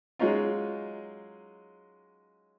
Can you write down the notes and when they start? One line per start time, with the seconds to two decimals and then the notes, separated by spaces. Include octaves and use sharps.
0.19 F#3 G#3 C#4 D#4 F4